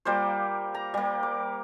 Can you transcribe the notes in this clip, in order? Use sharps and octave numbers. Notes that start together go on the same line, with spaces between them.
G3 A#3 F4 C5
A#5
G3 A#3
D6